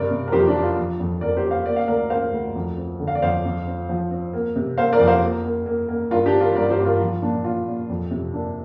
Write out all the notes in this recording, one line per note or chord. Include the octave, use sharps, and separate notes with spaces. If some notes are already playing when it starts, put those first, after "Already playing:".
Already playing: G2 C3 A#4 D5
C3
A#4
F2 G4 C5
D4 G4
F3
F4
F3
F2
F2 A#4 D5
G4 C5
C4
C5 F5
A#3 D5
F5
D2 A#4 D5
A#3 C5 F5
D2
F2
C4
D3
F5
D5
F2 C5 F5
F2
C4
F3
C4
A#3
C3
A#3 C5 F5
A#4 D5
F2
C5 F5
A#3
A#3
A#3
A#3
G2 F4 A#4
D4 G4
C4
F4 A#4
G2 A#4 D5
G4 C5
G2
F4 A#4
F3 F4
A#2 D4
A#2 F4
A#2
F2
C3
A#3 D4